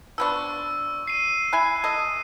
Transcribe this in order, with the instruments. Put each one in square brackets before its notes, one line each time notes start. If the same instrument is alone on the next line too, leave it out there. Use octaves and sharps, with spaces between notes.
[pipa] F3 B3 D4 [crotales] C#6 E6
[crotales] C7 D#7
[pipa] E4 G#5 [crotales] F#6
[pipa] A4 D#5